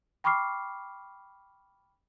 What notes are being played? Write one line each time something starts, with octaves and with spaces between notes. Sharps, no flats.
G5 B5 C#6 D6 F6 C7